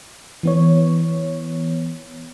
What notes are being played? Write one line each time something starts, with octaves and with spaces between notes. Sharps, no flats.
E3 B3 C#5